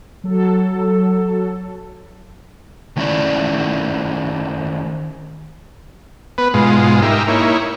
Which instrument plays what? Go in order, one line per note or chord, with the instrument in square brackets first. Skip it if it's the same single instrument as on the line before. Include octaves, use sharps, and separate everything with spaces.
[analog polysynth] F#3 A4
[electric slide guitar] D#3 A3 C#4 E4 D5
[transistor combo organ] B3 B4
G#2 B2 G#3 F4
D#4 G4 A#4 E5
A#3 D#4 E4 C#5